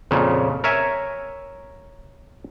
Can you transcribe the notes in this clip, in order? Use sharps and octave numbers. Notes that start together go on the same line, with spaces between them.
F2 A#2 C#3
A#4 C#5 E5 G#5